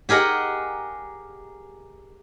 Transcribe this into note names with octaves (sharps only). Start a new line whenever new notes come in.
G4 G#4 A#4 D#5 F#5